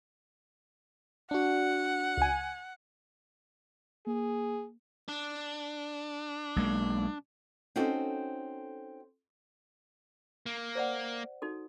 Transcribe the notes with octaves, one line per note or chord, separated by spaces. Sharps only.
D4 F#4 F#5
C#2 G#5
A#3 G#4
D4
B1 G#3 A#3
C4 C#4 D#4 F#4 A4 C5
A#3
C5 D5 F#5
D#4 F#4 A4